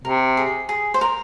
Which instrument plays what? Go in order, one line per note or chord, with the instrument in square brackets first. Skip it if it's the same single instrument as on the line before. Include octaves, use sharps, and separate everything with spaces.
[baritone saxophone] C3 [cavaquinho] A#4
[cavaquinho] G#4
G#4
C5
A#4